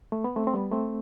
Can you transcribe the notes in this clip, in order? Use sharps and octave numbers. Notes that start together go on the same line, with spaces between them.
A3
B3
A3 C4
C4
G3 B3
A3 C4